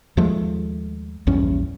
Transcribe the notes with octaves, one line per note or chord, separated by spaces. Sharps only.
D#2 F3 G#3 A3
A#1 E2 G2 C#4